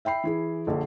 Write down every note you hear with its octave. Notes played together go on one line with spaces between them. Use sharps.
E5 G5 B5 C7
E3 E4 G#4
A#1 D3